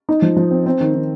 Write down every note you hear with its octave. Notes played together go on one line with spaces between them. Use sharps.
D#4
F3
F3
C4
C4
D#3
D#3